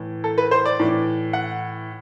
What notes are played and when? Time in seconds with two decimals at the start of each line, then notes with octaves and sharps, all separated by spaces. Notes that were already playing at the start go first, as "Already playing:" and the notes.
Already playing: A2 E3
0.24 A4
0.38 B4
0.51 C5
0.65 D5
0.80 A2 E3
1.33 F#5